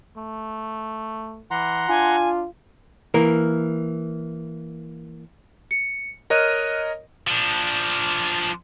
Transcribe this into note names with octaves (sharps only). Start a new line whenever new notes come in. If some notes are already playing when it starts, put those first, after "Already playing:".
A3
E3 F#5 A#5 C6
D4 F4 G#5
E3 A#3 A#4
C#7
A#4 C#5 D#5 F6 F#6 D#7
F3 D4